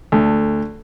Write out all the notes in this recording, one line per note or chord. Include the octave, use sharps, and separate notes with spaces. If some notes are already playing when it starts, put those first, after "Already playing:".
D2 A3